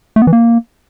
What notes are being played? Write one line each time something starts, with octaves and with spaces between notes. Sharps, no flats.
A3
B3
E3
A#3